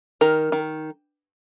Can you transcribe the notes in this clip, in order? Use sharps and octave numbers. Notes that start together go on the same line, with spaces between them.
D#3 A#4
D#3